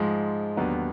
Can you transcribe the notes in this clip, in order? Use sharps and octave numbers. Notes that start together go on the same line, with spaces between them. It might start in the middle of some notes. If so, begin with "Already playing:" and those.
Already playing: G#2 F3 G#3
D#2 D3 F#3 B3 D#4